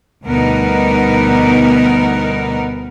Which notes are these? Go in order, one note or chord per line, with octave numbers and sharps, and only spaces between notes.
D2 B2 G3 B3 D#4 A#4